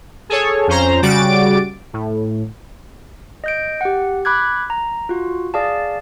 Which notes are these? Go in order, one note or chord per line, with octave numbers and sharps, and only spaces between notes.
G#4 A4 C#5
F2 C#4 C5 A#5
C#3 G3 F#4 D6 A6 D7
A2
D#5 G6 D7
G4 F#5
B5 D6 F#6 G#6
A#5
F4 F#4
G#4 D5 F5 A5